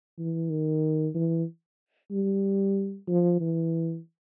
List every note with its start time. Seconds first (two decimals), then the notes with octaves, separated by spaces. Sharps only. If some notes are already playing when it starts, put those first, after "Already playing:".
0.18 E3
0.50 D#3
1.14 E3
2.11 G3
3.08 F3
3.40 E3